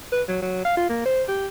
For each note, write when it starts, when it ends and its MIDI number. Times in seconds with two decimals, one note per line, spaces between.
0.12 0.23 71
0.28 0.38 54
0.42 0.63 54
0.65 0.77 77
0.77 0.89 65
0.89 1.03 58
1.05 1.23 72
1.28 1.48 67